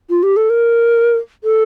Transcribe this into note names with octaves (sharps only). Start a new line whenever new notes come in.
F4
G4
A4
A#4
A4